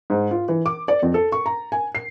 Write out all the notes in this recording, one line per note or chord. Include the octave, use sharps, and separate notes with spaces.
G#2
F4
E3
D6
D5
F2
A4
C#6
A#5
G#5
C7